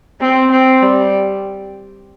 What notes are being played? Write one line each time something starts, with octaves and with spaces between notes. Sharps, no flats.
C4
C4
G3